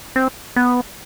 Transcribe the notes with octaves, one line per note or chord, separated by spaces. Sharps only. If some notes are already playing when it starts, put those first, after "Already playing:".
C4
B3